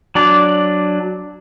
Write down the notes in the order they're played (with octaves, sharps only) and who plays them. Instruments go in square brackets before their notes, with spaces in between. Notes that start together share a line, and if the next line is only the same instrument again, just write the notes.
[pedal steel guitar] F#3 D4 D5